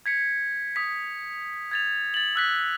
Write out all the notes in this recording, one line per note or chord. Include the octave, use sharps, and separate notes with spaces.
G#6 B6 C#7
D#6 B6
G#6 A6 F7
A6 F#7
E6 F#6 B6